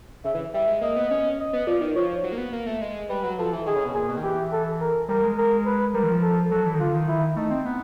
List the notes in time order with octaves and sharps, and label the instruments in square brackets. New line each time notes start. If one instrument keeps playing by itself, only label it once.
[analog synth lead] C#3 [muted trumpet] E5
[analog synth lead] E3
[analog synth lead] G3 [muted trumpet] E5
[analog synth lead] G#3
[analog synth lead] A#3 [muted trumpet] D#5
[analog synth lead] B3
[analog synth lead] C#4 [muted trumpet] D#5
[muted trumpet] D#5
[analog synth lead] B3
[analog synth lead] F3 [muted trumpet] D5
[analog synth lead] D#3
[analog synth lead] F3 [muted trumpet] C#5
[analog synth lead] F#3
A#3
B3
A#3
A3
G#3
[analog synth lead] G3 [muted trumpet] B4
[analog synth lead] F#3
[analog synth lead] F3 [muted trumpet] A4
[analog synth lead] E3
[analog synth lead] D#3 [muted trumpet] G#4
[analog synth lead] C#3
B2
[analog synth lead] A#2 [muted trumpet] G#4
[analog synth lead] B2
D#3
[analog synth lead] E3 [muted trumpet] G4
[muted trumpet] A4
A#4
[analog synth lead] G3 [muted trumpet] A#4
[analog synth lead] G#3
[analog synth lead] G#3 [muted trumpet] A#4
[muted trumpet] B4
[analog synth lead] G3 [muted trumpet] A#4
[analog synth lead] E3
F3
[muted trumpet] A4
[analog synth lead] F#3 [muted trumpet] A4
[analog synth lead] E3
D#3
[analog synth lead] D3 [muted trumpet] F4
[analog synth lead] D#3
[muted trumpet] E4
[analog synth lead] A3 [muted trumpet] D#4
[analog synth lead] C4
B3